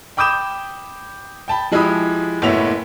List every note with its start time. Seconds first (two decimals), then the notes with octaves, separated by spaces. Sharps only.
0.17 G5 B5 D6 D#6 G6 E7
1.48 G5 A5 B5
1.72 F3 G#3 E4 G4 B5 D#6
2.42 F#1 A2 B3 C#5 E5 F7